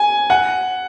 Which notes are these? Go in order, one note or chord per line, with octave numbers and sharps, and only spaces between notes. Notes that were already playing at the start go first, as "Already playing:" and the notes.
Already playing: G#5
F#5